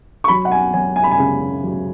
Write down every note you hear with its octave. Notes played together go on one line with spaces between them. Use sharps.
C#6
F#3 B5
F#5
G#5
F#3 G#5
G#5
B5
G#5
C#3
F#3